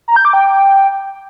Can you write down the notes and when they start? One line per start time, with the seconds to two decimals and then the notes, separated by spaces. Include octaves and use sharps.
0.08 A#5
0.16 G6
0.25 D6
0.33 G5